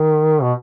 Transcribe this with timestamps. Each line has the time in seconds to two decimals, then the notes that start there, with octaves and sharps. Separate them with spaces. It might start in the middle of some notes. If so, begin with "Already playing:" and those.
Already playing: D#3
0.42 B2